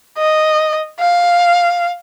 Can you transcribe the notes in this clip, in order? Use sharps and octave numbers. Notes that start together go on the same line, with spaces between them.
D#5
F5